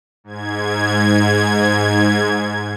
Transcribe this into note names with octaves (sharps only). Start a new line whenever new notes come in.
G#2 G#6